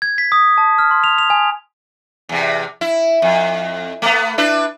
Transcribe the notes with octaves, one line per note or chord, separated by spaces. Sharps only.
G#6
B6
D#6
A5
F6
C6
F7
F7
G#5
E2 C3
E4
F2
A3 B3
D4 E4 B4